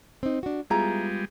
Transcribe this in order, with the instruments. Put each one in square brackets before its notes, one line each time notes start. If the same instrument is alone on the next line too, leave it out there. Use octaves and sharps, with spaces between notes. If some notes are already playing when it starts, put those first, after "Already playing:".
[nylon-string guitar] C4 D#4
D4 F#4
[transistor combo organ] G3 G#3 [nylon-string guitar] B3 F4 G#4 [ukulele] E4 A#5